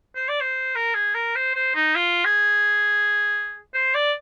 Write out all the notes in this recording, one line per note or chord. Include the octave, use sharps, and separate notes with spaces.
C5
D5
C5
A#4
G#4
A#4
C5
C5
D#4
F4
G#4
C5
D5